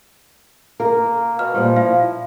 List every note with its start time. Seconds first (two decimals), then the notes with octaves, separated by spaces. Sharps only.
0.80 A#3 A#4
1.39 B2 F6
1.54 A#2 F3 G3
1.76 E4 F5